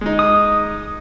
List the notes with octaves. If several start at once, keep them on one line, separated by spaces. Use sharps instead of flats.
G#3 D#4
D#6